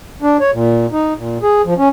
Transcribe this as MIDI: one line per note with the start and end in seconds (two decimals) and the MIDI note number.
0.22 0.37 62
0.40 0.51 73
0.53 0.87 46
0.92 1.14 63
1.17 1.38 46
1.43 1.62 68
1.65 1.74 53
1.78 1.89 61